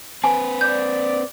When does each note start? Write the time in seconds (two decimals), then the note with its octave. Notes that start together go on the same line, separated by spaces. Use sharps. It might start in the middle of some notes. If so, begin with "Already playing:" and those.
0.24 C4 B4 G#5 C#6
0.61 D5 G6